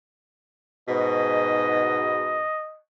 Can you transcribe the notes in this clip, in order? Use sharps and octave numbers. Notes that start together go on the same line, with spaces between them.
G#2 B2 D#5